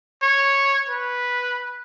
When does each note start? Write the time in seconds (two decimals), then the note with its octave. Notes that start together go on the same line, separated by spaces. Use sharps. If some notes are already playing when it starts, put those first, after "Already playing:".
0.22 C#5
0.89 B4